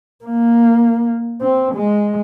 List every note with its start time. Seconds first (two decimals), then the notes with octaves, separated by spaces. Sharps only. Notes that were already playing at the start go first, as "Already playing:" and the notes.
0.24 A#3
1.41 C4
1.75 G#3